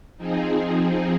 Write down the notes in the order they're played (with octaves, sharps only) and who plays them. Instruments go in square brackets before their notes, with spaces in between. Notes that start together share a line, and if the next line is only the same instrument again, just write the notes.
[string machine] F3 C4 D#4 G#4